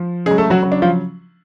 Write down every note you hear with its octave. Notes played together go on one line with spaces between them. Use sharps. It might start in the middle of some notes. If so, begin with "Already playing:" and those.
Already playing: F3
C#3 G#3 G#4
F#3
A3 A4
F#3 F#4
C#3 F#3
D4
F3 F4